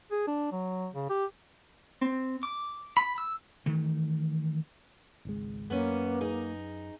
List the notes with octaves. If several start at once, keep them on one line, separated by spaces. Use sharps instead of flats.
G#4
D4
F#3
C#3
G4
C4
D6
B5
E6
D#3 E3 A3
G#1 C#2 G#3
F#2 A#3 B3 C#4
D#4 G#4